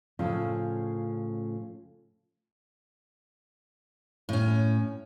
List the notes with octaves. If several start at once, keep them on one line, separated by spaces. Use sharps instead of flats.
A2 C#3 F3 C#4
A2 C#4